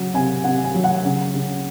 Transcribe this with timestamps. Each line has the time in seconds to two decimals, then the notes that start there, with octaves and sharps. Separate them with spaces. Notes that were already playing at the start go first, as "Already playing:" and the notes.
Already playing: C#3 F#3
0.14 C3 G#5
0.44 C3 F#5
0.64 G#5
0.74 F#3
0.84 F#5
1.05 C#3
1.34 C#3